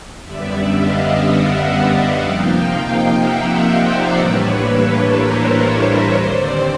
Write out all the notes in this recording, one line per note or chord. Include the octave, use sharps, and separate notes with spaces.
F#2 D3 G3 B3 D5 E5
D#5 F5
E5 F#5
C3 F3 A#3 D#4 F5 G5
F5 G5
E5 F#5
C5 D5
A2 E3 G3 A#3 D4 B4 C#5
A4 B4
A#4 C5
B4 C#5
D#2 D3 G3 C4 C5 D5